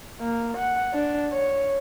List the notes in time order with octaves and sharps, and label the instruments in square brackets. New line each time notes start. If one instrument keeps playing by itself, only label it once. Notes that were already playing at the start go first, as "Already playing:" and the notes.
[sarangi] A#3
F#5
D4
C#5